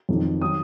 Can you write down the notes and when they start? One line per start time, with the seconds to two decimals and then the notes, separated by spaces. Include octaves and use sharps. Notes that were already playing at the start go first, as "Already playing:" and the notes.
0.09 F2 D#3 F#3
0.41 D#3 F#3 D#6